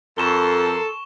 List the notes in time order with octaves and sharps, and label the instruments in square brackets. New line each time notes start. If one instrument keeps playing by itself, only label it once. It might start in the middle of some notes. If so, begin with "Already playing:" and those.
[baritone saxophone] F2 [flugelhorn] A4 [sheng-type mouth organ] A#4 C6 [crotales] C#6 E7 G7